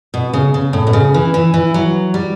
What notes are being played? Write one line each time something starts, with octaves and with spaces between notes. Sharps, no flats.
B2
C#3
C#3
A2
B2
C#3
E3
E3
E3
F#3
G3